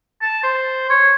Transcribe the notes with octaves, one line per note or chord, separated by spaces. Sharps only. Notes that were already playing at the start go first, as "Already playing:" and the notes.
A5
C5
C#5